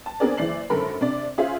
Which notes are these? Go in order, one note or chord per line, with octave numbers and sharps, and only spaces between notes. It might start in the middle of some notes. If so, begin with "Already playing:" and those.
A5
B3 C4 D4 G#4 A#4 D5
F#1 E3 D5 C7 F#7
G#1 F#2 D3 A4 A#4 B5
C3 D4 D5
C#4 F4 G#4 C5 E5 F5